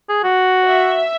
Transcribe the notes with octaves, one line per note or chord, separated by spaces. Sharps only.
G#4
F#4
E5